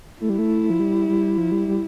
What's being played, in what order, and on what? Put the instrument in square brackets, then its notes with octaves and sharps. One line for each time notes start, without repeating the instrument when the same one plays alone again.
[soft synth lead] A3 [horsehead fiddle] E4
[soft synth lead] G3
A3
F3
G3
G3
F3
G3
G3